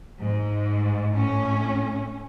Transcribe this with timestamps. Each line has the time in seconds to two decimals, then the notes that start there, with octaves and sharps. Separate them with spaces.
0.22 G#2
1.13 A2 C#4